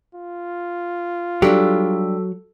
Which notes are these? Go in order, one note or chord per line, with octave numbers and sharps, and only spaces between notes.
F4
F#3 G3 D4 G4 A4